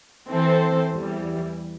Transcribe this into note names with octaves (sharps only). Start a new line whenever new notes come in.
E3 C4 A4 C5
E2 E3 G3